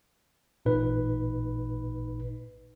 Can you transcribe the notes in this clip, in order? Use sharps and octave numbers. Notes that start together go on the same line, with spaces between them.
A1 A#2 D#4 B4